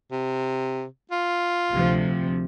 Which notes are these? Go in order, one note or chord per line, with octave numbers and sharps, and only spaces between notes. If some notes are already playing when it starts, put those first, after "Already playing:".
C3
F4
D2 C3 F3